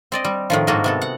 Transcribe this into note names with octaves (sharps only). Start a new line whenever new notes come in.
C4 D5 D#5
G3
A2 D#3 F3
G#2 A#3 F#4 A4 D#5
C3 B3 A4
F#5